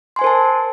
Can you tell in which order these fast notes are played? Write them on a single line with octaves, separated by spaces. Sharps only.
C6 G#5 C5 A#4 A5